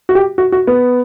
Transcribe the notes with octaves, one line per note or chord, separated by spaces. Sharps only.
F#4
G4
F#4
F#4
B3